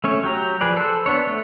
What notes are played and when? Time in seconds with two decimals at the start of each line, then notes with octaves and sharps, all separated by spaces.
0.04 A3 C#4 C#5
0.24 F#3 G4 A#5
0.61 F3 G#4 B4 D5
0.77 A4 C5
1.06 B3 D4 C#5
1.27 A3